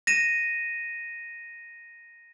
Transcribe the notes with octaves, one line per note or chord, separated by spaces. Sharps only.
A#6 D#7 E7